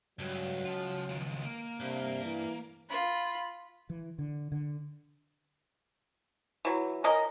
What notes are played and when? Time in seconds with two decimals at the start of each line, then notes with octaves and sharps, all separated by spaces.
0.19 C#2 G2 F#3
0.65 F4 A5
1.09 D#3 F3
1.43 A#3
1.80 G2 C3
2.24 E3
2.90 F4 B5
3.90 E3
4.18 D3
4.52 D3
6.65 E3 F#3
7.04 C#4 A#4 D#5